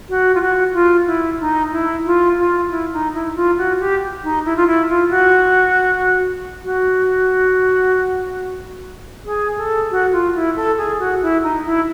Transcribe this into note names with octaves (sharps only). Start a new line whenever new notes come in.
F#4
F4
F#4
F4
E4
D#4
E4
F4
F4
F4
E4
D#4
E4
F4
F#4
G4
D#4
E4
F4
E4
F4
F#4
F#4
G#4
A4
F#4
F4
E4
A4
G#4
F#4
E4
D#4
E4